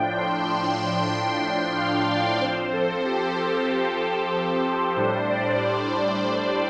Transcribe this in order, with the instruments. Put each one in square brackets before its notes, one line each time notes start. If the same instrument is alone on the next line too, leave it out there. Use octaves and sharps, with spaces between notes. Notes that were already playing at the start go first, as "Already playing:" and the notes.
Already playing: [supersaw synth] A2 F3 D4 G5
C6
F5
D5
F3 C4 C5
A4
G4
A4
A2 G3 D4 C5
D5